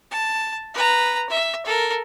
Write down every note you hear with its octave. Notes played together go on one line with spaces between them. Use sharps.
A5
B4 A#5
E5
A4 A#4